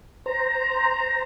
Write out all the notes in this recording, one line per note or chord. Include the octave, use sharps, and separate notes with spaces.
C5 A#5